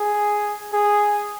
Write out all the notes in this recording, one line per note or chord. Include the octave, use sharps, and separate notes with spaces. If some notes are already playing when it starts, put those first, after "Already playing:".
Already playing: G#4
G#4